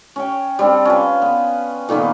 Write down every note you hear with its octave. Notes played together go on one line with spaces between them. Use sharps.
C#4 C#5 G5
G3 C4 D4
C#4 F4 B4
B3
A#2 D#3 A#3 B3